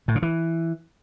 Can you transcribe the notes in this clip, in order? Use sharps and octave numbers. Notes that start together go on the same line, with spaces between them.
A2
C#3
E3